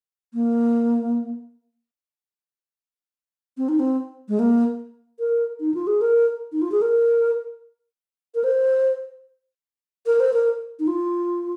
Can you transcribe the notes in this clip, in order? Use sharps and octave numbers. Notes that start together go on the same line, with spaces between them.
A#3
C4
D#4
C4
G#3
A#3
A#4
D#4
F4
G#4
A#4
D#4
F4
G#4
A#4
A#4
C5
A#4
C5
A#4
D#4
F4